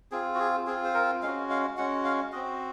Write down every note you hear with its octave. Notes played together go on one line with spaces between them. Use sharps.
C4 F4 G#4
F#4
G#4
C4 F4 G#4
C5
A#4
G#3 C#4 F#4 F5
F5
G#3 C#4 F#4 F#5
F5
C4 F#4 D#5